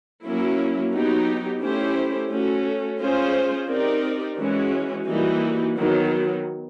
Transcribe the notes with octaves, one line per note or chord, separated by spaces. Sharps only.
F#3 A#3 C#4 E4
F#3 B3 D#4 G4
A3 C#4 E4 G4 C5
A3 C#4 F#4 A4
G#3 C#4 F4 G#4 C5
C4 D#4 G4 A#4 D5
E3 G#3 C#4 F#4
E3 G3 A#3 D#4 F#4
D#3 F#3 B3